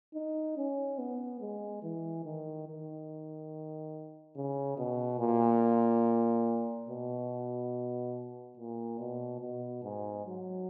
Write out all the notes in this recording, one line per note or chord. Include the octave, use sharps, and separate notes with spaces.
D#4
C#4
B3
G#3
E3
D#3
D#3
C#3
B2
A#2
B2
A#2
B2
B2
G#2
F#3